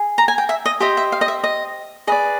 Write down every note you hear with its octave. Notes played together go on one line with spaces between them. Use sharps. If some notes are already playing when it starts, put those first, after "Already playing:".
Already playing: G#4
A#5
G#5
G5
E5
D#5
G4 C5 D#5 E5
E5
F5
D#5
E5
D#5
G#4 B4 D5 D#5